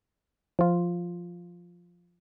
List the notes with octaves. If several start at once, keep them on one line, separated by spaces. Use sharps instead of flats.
F3 F4